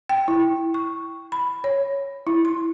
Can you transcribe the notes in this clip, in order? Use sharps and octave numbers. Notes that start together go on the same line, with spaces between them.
G5
E4
C#6
B5
C#5
E4
C6